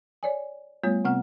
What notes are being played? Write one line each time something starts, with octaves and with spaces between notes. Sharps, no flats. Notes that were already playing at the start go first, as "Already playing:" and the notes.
C#5 D5 G#5
G3 A3 B3 F4 C#5
C3 B3 C4 F#5 F6